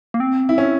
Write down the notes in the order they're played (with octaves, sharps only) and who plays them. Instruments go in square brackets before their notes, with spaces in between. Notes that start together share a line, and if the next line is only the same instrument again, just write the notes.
[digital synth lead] A#3
C4
[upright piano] E4
C#4